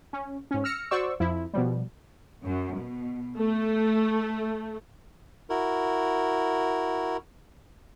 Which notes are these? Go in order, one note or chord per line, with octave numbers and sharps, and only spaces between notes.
C#4
G#2 C#4
E6 F6 A#6 C#7
F#4 C5 D5 C#6 E6
F2 F3 E4
B2 F3 G3
F#2
B2
A3
E4 F#4 A#4